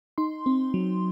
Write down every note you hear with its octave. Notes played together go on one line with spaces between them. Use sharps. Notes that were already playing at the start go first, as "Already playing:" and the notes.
D#4 C6
C4
F#3